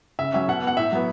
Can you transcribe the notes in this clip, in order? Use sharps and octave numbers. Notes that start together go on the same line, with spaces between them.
C#3 E5
F#3 C#4 E5
B2 F#5
B3
F#5
A2 E5
F#3 B3